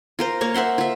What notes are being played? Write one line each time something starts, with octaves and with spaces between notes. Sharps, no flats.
F4 A#4 C5
A#3 C#5 C#6
C5 E5 F#5 C6
F4 E5